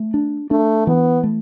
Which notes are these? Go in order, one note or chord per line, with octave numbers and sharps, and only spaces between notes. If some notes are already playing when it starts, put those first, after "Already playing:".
Already playing: A3
D4
A3 D4
E3 B3
A3